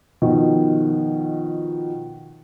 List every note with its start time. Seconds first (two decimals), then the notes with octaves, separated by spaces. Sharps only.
0.22 B2 D#3 F3